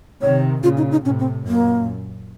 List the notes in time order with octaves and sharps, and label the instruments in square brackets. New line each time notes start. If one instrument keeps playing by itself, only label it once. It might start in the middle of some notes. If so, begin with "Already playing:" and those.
[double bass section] C3 D#3 [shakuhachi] C#5
[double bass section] A#2 C#3 [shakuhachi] F4
[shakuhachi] D#4
D#4
[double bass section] A2 C3 [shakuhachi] C#4
[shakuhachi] C4
[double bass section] F#2 A#2 [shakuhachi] A#3